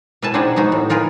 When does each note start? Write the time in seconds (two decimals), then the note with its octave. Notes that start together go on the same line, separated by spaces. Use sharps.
0.22 B2 E4 B4 G#5 A5
0.34 C4 D4 D#4 G#4 F#5
0.56 G#3 B3 D#4 F#4
0.72 A2
0.90 D#4 F4 G#4 A#4 B4